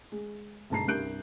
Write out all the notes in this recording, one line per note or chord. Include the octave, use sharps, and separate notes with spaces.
G#3
G1 G#2 B2 A5 A#5 C7
C2 G2 A#4 F#6 G6 D7